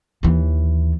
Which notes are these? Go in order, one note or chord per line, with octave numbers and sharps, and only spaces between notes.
D#2 E3